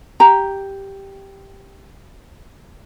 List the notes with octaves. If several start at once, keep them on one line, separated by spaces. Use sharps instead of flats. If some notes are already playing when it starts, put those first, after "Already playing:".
G4 A#5